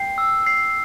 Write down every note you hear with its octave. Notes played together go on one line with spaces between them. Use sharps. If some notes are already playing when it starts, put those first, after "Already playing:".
Already playing: G5 C7
E6
C7